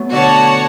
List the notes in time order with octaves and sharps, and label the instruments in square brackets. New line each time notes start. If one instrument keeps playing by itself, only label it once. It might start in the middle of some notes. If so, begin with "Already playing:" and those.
Already playing: [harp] F#3 A3 B3
[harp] B2 D3 [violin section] F#4 C#5 F#5 A5